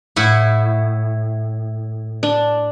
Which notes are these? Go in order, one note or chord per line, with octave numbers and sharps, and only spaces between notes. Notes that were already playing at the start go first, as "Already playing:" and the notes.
A2 E4 F#5
D4